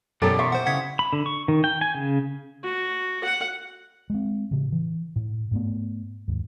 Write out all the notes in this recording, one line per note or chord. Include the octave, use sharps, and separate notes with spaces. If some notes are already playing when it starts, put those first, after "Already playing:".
F#2 B2 E3 F#3 G3 A4 A#4 D6
E5 C6 C#6
C5 F#5
C#3 E4 F#5 G#6 B6
B5
D3
C#6
D#3
G5
G#5
C#3
F#4
F#5
G#3 C4
A2 C#3
E3
A2
G#2 A3 B3
D#2 G#2